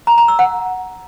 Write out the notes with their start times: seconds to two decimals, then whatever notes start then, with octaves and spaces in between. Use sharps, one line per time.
0.07 A#5
0.18 A#5
0.28 E6
0.39 F#5